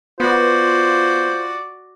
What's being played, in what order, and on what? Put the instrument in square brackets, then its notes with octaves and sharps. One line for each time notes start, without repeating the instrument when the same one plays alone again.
[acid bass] B3 [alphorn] F4 [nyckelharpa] F#4 D5 [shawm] C5